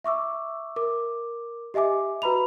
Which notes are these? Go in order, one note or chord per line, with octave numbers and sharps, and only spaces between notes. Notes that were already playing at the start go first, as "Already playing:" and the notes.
E5 C#6 D6 E6
A#4 D6
G4 D#5 E5 G#5 D6
F#4 B4 A#5 B5 F7